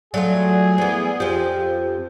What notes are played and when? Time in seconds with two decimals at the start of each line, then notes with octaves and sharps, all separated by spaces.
0.14 F#3 A3 F4 G#4 D5
0.78 E3 B3
1.20 F2 F3 G4